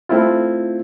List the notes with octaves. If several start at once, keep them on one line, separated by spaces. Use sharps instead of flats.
A3 C4 E4 F4